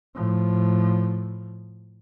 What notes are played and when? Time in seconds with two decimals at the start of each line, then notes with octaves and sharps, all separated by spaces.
0.15 A2 F3